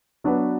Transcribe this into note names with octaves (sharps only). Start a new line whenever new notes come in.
F#3 B3 D4 F#4 B4